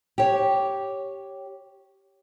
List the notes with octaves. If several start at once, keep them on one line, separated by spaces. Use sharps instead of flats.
G4 C#5